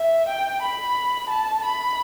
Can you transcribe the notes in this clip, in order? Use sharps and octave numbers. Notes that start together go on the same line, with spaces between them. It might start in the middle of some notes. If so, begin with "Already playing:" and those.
Already playing: E5
G5
B5
A5
B5